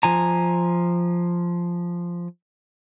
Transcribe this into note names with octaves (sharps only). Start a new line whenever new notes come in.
F3 G#5 A#5